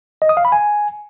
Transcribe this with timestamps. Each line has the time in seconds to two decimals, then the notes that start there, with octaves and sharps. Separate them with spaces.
0.22 D#5
0.29 D#6
0.37 F5
0.45 B5
0.52 G#5